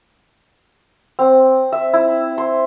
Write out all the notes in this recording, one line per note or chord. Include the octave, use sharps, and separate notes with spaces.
C4
E5
E4
C6